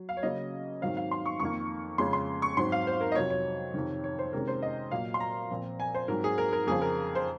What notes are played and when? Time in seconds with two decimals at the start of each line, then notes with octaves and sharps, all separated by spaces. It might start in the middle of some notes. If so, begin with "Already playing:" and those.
Already playing: F#3
0.09 F5
0.17 C#5
0.23 C#3 F#3 A#3 C#4 D#5
0.81 G#2 D#3 F#3 C4 F5
0.97 F5
1.11 C6
1.26 C#6
1.40 F2 D#3 A#3 C#6
1.98 F2 C#3 G#3 C#4 C6
2.13 C6
2.42 C#6
2.57 G#2 F#3 C4 C6
2.72 F5
2.87 C5
3.01 A#4
3.12 D#5
3.15 F2 C3 F#3 C#5
3.30 C#5
3.74 F2 C3 D#3
4.04 C#5
4.19 C5
4.33 C3 D#3 G#3 C#4 A#4
4.48 C5
4.62 D#5
4.91 A#2 F#3 A#3 F5
5.14 C6
5.20 A#5
5.51 A#2 F3 C4
5.80 G#5
5.95 C5
6.08 G#2 F#3 C4 A#4
6.24 G#4
6.38 A#4
6.53 A#4
6.67 F2 C#3 F3 G#4
6.82 A#4
7.15 C5